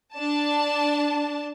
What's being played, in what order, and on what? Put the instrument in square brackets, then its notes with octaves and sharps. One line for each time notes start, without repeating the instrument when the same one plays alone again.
[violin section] D4 A5